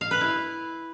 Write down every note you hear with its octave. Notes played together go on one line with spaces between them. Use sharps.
F5
B4
E4